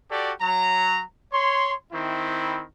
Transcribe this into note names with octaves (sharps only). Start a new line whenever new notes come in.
F#4 G4 A4 D5
F#3 A#5
C#5 C6
D#3 C4 E4